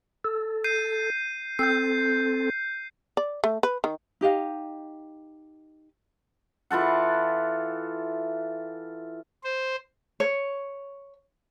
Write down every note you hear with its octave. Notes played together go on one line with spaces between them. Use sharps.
A4
G6 C7 D#7
C4 A4 G6 C7
D5
A3
B4
D#3
D#4 G4 D#5 F5
E3 F4 A4 F#5
C5
C#5